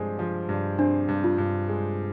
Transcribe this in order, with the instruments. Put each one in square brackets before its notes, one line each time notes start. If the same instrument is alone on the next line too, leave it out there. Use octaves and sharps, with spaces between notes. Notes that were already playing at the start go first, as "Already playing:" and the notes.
Already playing: [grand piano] G2 F3 G#3 C4
F3
G2
[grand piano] C4 [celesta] D4
[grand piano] G2
[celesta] F4
[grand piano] G2
G#3